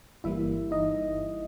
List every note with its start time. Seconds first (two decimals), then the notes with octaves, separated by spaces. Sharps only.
0.24 G1 G2 E3 G3 A#3 E4 E5
0.71 D#4 D#5